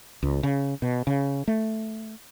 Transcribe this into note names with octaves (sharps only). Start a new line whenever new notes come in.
C#2
C#3
B2
C#3
A3